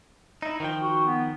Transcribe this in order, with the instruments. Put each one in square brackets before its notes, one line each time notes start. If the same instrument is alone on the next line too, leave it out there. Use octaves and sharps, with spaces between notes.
[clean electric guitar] D#4 E4
D#3 F3 G5
[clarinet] F#4
B3